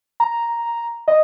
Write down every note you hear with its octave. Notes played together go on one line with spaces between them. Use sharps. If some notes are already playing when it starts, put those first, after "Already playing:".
A#5
D#5